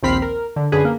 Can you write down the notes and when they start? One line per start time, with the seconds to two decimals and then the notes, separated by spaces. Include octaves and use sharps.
0.03 A#1 D#2 C4 B5 F6 C7
0.22 A#4
0.56 D3
0.72 F#2 D3 G#4 B4
0.85 A#3